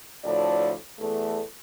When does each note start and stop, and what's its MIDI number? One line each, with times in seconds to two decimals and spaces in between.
0.25 0.72 38
0.25 0.72 45
0.25 0.72 53
0.25 0.72 69
0.25 0.72 74
0.99 1.40 40
0.99 1.40 57
0.99 1.40 69